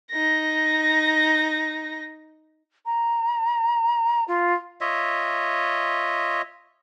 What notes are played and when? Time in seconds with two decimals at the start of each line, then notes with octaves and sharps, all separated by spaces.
0.11 D#4 A#6
2.86 A#5
4.28 F4
4.81 F4 C#5 D#5 E5